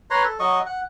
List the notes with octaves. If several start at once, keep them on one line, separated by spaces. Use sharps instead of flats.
B4 C#5 A#5 C6
A4
F#3 D#5 C#6
F#5